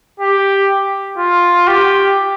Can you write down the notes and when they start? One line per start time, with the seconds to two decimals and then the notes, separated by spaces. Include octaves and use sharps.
0.20 G4
1.18 F4
1.67 G4